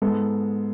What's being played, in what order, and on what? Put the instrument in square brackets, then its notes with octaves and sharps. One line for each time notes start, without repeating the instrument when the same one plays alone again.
[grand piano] G#2 G#3 B3 A4